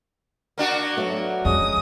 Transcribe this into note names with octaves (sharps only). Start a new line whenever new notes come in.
A#3 D4 F#4
F#3 A3 B3
F2 G#3 C#4 D#6